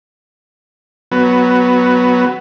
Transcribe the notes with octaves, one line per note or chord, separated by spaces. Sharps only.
F#3 B3